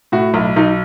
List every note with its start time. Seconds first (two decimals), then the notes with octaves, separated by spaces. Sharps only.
0.12 A2 F#4
0.34 B1
0.56 B1 D#4